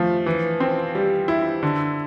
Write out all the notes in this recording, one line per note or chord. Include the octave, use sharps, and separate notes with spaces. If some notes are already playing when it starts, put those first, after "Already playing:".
Already playing: F3 A3
E3
C4
G3
E4
D3